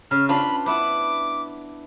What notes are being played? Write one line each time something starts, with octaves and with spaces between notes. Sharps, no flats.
C#3 F6
D4 F4 B4 B5
B3 E4 B4 D6